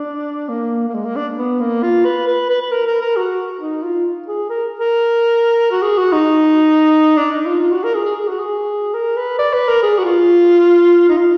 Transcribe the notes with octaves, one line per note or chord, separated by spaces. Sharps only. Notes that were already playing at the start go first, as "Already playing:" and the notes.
Already playing: D4
A#3
A#3
G#3
A#3
D4
B3
A#3
F4
B4
B4
B4
B4
A#4
A#4
A#4
F#4
D#4
F4
G#4
A#4
A#4
F#4
G#4
F#4
D#4
D4
D#4
F4
F4
F#4
A#4
G#4
G#4
G#4
F#4
G#4
A#4
B4
D5
B4
A#4
G#4
F#4
F4
D#4
F4